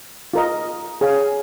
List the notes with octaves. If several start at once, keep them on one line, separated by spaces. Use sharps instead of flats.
F4 A#4 D#5
G#4 C#5 F5 G#5